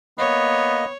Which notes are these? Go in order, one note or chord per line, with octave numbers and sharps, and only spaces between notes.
A#3 B3 C#5 D#5